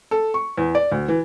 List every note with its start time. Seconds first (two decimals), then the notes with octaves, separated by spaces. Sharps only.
0.11 A4
0.34 C#6
0.57 E2
0.75 D5
0.92 D2
1.08 E3